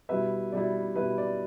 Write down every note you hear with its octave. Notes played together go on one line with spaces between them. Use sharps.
B2 G3 E4 B4 E5
B2 G3 E4 D5
B2 G3 E4 B4
D5